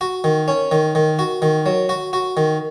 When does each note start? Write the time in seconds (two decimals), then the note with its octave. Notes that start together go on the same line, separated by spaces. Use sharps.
0.01 F#4
0.24 D#3
0.48 C#4
0.71 D#3
0.95 D#3
1.19 F#4
1.42 D#3
1.66 F#3
1.89 F#4
2.13 F#4
2.37 D#3